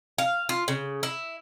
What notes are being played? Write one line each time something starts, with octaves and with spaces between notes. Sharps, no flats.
F5
F4
C#3
E4